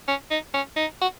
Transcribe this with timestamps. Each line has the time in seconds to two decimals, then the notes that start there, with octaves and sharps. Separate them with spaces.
0.08 C#4
0.31 D#4
0.54 C#4
0.76 D#4
1.02 F#4